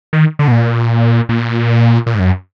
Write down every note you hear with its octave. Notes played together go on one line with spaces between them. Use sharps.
D#3
D3
B2
A#2
A#2
A#2
G#2
F#2